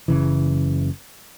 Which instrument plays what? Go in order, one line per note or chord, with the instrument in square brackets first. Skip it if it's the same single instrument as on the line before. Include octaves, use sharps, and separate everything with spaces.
[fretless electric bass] F#1 C#3 E3